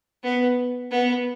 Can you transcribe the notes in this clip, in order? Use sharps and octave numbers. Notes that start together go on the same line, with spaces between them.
B3
B3